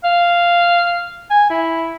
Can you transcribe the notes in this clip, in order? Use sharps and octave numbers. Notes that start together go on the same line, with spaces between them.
F5
G#5
E4